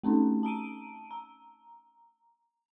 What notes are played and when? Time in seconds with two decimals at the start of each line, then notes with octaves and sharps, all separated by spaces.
0.03 A3 C4 C#4 D#4
0.43 A5 A#5 D7 D#7
1.11 A#5